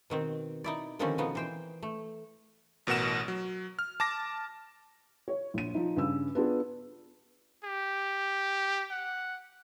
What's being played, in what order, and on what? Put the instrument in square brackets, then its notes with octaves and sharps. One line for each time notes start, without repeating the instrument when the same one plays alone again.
[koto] B2 D#3 C4
D#4 E4 D5
D3 D#3 F3 G3 C4 C#4
B2 F3 B3 D#4
E3 C5 G5
A3
[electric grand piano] A1 B2 A#4 F#5 E7
F#3
F6
A5 D6 A#6
[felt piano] C#5
A#1 D#7
F3 D#4
G2 C#3 E6
B3 D4 F4 G#4
[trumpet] G4
F#5